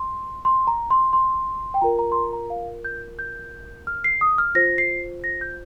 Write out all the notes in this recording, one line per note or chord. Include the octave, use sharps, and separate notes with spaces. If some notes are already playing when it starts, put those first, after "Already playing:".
Already playing: C6
C6
A#5
C6
C6
G5
F4 A#4 A#5
A#5
C6
A#5
A#5
F5
G6
G6
F6
C7
D#6
F6
F4 C5 A#6
C7
A#6
G6